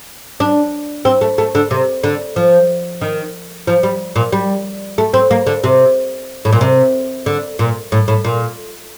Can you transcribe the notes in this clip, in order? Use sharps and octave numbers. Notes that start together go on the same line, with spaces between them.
D4
C4
A3
A3
D3
C3
D3
F3
D#3
F3
G3
A#2
G3
A3
C4
A#3
D3
C3
A2
A#2
C3
D3
A#2
A2
A2
A#2